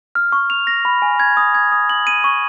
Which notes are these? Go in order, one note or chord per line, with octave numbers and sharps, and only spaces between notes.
F6
C#6
F7
A#6
B5
G#5
G#6
D#6
G#6
D#6
F#7
D#7
C#6